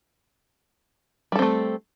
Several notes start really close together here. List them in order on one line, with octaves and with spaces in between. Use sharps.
G3 A4 C4 A3